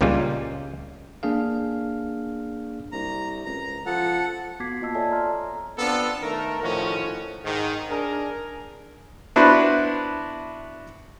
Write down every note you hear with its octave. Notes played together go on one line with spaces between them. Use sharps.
C#2 A#2 G3 G#3 C#4 F4
A#3 D4 G#4 F5
C2 A#5
C#2 A#5
F3 A4 F#5
B3 F#4 D6 G#6 B6 C7
A#3 F4 D#5 A5 E6
A4 C#5 D5 E5 G#5 A5
A4 A#5 C6 F6
A#5
B3 C4 D4 F4 A4
D#3 A3 A#4
A2 D#3 F3 C#4 F#4
G#2 D#3
D4 G#4 A#4
B3 D4 E4 F#4 B4 C5